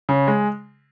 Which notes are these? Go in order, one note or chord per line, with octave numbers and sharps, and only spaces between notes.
C#3
G#3